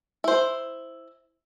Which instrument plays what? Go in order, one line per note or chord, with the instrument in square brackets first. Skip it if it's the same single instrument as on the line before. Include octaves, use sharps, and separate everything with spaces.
[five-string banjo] E4 C5